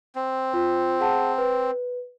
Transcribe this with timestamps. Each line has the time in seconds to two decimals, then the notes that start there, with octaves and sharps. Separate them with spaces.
0.15 C4
0.53 F4 C5
1.00 G#4 F#5 A5
1.38 B4